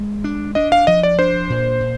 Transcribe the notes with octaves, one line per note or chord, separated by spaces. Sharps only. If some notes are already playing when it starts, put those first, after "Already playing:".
Already playing: G#3
D4
D4 D#5
F5
F3 D#5
D5
D4 C5
A#2
A#2